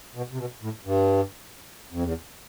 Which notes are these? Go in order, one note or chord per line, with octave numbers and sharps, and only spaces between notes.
B2
C3
B2
A2
G2
F2
E2